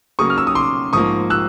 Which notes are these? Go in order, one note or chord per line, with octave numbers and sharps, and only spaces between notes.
C#3 F#3 A#3 C#6 D#6
F6
E6
D#6
C6 D6
G#2 F3 A#3 C#6 D#6
E6 F#6